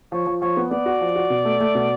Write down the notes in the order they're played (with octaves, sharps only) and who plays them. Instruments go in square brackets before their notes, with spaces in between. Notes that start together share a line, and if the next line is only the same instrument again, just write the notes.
[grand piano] F3 [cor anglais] C#5
[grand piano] F3
[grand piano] F3 [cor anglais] C#5
[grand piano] B3
[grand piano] B3 [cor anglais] D5
[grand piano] F#4
F3
F#4
B2
A3
A3
B2